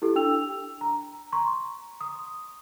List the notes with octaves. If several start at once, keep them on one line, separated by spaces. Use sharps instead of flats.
E4 G4 A4
D4 G5 E6 F7
A#5
A#5 C6 C#6
D#6